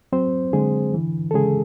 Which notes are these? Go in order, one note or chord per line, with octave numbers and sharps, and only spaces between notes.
F#3 C4 C5
D3 G#3 G#4
E3
A4
C#3 G#3 G#4